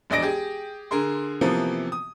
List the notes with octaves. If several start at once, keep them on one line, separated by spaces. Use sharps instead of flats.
E1 A#1 D5 D#5 A#6 D7
G4 G#4
D3 G#4 A#4 C6
C3 E3 F3 A#3 B3
D#6